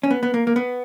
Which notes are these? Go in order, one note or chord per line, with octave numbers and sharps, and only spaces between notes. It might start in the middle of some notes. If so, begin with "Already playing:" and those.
C#4
B3
B3
A#3
A#3
B3